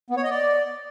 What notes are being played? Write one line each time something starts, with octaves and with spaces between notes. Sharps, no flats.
B3
C#5
D#5
D5